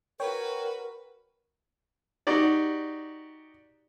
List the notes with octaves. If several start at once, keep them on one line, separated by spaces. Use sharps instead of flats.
F#4 A#4 B4 C#5 G5
D#4 F#4 G4 D5